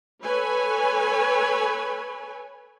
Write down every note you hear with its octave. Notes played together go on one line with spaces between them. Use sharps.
A4 B4 C#5 G#5